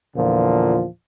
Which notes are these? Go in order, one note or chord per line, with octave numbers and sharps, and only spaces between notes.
E2 A#2 D3 F3